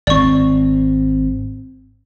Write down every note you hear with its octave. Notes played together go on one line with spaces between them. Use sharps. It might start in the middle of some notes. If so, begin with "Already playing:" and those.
G#1 C4 D5 C#6